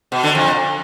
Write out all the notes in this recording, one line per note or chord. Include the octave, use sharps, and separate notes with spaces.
B2
D3
F2